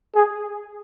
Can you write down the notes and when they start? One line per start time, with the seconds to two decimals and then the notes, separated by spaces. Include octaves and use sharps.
0.15 G#4